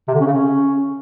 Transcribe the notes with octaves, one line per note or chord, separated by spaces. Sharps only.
C3
D3
C#4
C#3
C#4